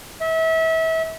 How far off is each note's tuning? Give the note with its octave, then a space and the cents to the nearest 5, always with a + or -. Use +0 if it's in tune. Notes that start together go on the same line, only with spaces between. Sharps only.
E5 -30